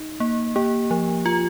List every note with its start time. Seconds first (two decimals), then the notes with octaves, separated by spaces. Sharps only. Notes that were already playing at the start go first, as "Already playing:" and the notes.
Already playing: D#4
0.20 A#3
0.56 A#3 G4
0.91 F3
1.26 F4